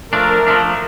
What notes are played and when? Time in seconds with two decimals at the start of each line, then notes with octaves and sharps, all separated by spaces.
0.12 F3 A3 D4 A#4
0.47 F3 A3 D4